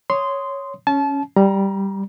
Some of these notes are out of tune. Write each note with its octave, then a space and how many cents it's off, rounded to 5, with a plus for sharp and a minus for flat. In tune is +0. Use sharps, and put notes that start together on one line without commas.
C#5 +0 C6 -15 D#6 +0
C#4 +0 A5 -30
G3 +0 A#5 +25